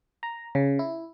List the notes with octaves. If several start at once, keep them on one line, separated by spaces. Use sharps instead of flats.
A#5
C#3
E4